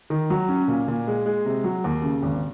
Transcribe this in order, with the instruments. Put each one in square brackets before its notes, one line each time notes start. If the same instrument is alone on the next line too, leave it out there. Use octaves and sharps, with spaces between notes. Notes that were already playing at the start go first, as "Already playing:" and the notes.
[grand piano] D#3
F#3
C#4
A#2
A#2
G#3
G#3
C3
F#3
D#2
C#3
G#1